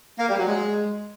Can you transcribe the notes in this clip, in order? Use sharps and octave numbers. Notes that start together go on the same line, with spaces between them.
A#3
G3
F#3
G#3